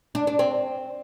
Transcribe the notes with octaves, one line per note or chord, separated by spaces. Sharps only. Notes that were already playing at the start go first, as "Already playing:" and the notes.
D4
D4
C4